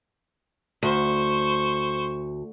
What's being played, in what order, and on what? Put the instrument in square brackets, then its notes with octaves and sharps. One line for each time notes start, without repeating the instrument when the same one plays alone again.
[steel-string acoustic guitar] D2 [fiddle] C5 C#6